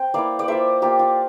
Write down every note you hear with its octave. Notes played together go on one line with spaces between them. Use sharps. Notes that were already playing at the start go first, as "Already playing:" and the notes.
Already playing: C4 C5 G5
A#3 E4 D5 F5
D5
A#3 F4 C5 E5
A#3 F4 G4
F4